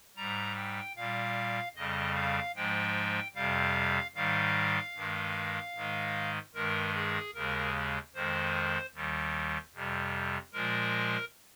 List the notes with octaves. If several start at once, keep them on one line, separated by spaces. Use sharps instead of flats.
G#2 G3 A#5
G5
A#2 G3 F5
F2 C#3 G3 D#5
F5
G#2 F3 G#3 G5
F2 C3 G3 F5
G#2 D#3 G3 F5
G2 D#3 G#3
G#2 D#3 G#3
G2 D#3 G#3 A#4
G#4
D#2 C#3 G#3 A#4
F2 D#3 G#3 C5
D#2 D#3 G3
F2 C3 G3
A#2 F3 G#3 A#4